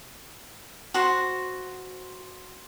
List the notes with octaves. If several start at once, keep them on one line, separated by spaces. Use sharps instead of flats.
F#4 C5